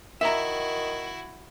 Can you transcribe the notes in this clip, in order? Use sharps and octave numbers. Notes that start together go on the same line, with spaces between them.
D#3 E4 F#4 E5 A#5